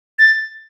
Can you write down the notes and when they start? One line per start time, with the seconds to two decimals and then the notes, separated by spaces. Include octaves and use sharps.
0.19 A6